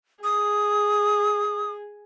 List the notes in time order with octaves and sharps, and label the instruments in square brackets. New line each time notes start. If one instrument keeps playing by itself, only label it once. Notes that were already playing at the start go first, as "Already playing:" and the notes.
[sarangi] G#4 [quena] D#6